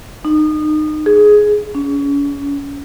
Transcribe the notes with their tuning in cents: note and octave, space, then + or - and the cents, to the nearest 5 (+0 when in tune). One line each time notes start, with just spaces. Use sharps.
D#4 -30
G#4 +10
C#4 +35